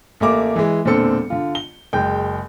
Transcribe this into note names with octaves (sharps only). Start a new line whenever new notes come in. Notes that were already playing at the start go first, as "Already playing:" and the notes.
A1 A3 A#3 D6
E3 G#3
E1 A#2 D3 C4 A4 C#7
D3 F4
G7
F#1 G#3 G5 G6